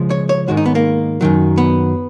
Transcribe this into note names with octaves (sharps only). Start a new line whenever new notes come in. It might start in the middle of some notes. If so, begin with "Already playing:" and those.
Already playing: C#2 C#3 F3 G#3
C#5
C#5
G#2 D#3 G#3 F#4
D#4
B3
A#3
F#2 D#3 F#3
B3